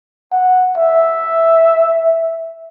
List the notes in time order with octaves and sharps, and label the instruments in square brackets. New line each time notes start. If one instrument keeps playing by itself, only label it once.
[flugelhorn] F#5
E5